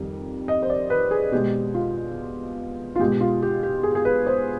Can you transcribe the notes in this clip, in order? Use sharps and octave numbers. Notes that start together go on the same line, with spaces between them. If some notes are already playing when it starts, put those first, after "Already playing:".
Already playing: F2 D#3 G3
D#5
C5
D5
B4
G#4
B2 G#3 G4
F4
F4
B2 G#3 G4
F4
G4
G4
G#4
G#4
B4
C5